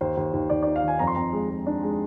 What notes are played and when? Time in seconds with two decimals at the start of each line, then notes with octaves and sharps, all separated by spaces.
0.01 D#2 C5
0.17 D#2
0.33 D#2
0.50 D#2 D5
0.63 D#4 D5
0.76 F5
0.84 D#3 G#5
0.99 F2 A#5
1.07 C6
1.15 F2 A#5
1.33 G#3
1.50 G#3
1.66 D4
1.83 G#3